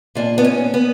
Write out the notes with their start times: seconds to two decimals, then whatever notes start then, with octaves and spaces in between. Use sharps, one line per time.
0.15 A#2 A#3 D4
0.38 B3
0.44 C#4
0.74 B3